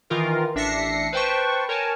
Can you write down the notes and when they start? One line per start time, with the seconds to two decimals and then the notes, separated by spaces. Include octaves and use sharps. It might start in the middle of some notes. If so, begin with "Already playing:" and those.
0.10 D#3 E3 F4 A#4
0.55 A1 D4 E5 A#6 C7 C#7
1.13 B4 C5 G5 A5 C#6
1.69 A#4 C#5 G#5 A5